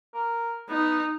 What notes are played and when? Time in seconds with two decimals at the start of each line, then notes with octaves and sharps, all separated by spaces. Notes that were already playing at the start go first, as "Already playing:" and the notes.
0.14 A#4
0.69 B3 D#4